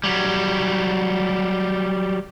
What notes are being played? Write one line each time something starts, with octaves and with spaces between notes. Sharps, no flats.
F#3 G3